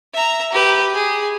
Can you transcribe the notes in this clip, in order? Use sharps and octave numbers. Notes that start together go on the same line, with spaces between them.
E5 A#5
G4 B4
G#4